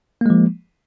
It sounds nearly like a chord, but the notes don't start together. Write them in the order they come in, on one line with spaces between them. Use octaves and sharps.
A#3 G#3 F3